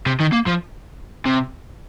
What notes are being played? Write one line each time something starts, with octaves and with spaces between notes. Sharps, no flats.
C3
D#3
A#3
F3
C3